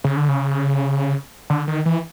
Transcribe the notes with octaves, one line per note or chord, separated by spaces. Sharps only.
C#3
D3
C#3
D3
D#3
E3